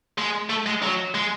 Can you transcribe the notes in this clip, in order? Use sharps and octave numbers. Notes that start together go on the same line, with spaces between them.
G#3
A3
G#3
F#3
G#3